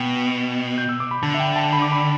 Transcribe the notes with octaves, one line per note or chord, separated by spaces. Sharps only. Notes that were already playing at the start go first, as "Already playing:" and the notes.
Already playing: B2 G5
G6
E6
D6
B5
D3 A5
E5
G5
A5
B5
D6
B5